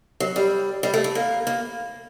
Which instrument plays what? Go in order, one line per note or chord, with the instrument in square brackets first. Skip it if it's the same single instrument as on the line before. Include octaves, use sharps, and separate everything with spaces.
[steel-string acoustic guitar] F#3
G3
G3
A3
A3
A#3
A#3